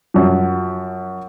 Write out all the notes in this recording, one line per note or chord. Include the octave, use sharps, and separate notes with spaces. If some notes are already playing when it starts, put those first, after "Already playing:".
F#2 F3